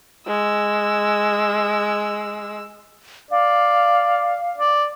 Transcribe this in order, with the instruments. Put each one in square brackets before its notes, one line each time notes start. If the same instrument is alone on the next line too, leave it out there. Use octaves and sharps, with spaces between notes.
[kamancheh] G#3 E6
[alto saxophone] D5 [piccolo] F5
[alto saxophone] D5